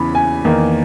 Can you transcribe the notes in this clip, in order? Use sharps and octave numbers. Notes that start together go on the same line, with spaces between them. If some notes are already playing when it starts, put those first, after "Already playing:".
Already playing: E2 C#3 E3 B3 B5
G#5
E2 D#3 A#3